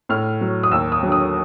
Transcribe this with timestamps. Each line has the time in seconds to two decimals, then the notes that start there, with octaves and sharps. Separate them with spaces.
0.09 A2 F6
0.41 F#3
0.63 D#6
0.72 D#2 E6
0.92 D#6
1.03 D3 F#3
1.12 D#6